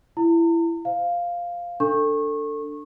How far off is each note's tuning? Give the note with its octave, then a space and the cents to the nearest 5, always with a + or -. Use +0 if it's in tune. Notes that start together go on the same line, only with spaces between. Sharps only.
E4 +20 A#5 -40
C5 +0 F5 +0
D4 +0 A4 +20 C#6 -25